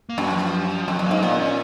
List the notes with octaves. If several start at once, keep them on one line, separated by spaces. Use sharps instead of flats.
A#3
F#2 F#3
F3
F2 F#3
F#2
A#3
G#2
A#2 B3
C#4